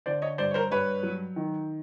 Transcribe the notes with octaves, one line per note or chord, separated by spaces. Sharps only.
D3 C5 D5
C#5 D#5
G2 C5 D5
C#5
A#4 C5
G2 B4 C#5
F#3
D#3